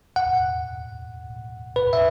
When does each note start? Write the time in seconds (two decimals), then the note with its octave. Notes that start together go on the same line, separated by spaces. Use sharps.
0.16 F#5
1.76 B4
1.93 E5